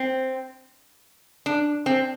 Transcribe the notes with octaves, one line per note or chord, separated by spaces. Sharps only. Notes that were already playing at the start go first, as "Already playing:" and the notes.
Already playing: C4
D4
C4